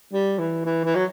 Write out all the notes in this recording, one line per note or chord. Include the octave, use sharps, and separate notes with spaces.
G3
E3
E3
E3
F#3